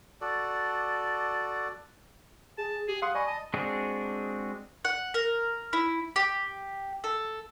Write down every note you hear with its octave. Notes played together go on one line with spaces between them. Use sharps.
F#4 A4 D5
G#4 A5
G4 G#4
F5 F#5 C6 D#6
D5 D#5 G#5 B5 C#6
D#5 A5
G#3 C4 D4 F#4 G#4
F#5
A#4
E4
G4
A4